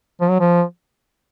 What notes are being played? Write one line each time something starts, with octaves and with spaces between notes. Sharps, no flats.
F3
F#3
F3